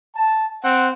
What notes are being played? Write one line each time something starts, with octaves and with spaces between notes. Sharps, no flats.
A5
C4 F#5